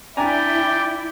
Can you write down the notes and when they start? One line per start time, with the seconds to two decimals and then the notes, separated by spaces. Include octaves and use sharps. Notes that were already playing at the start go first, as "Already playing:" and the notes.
0.17 D4 E4 D5 G5 G#5 A#5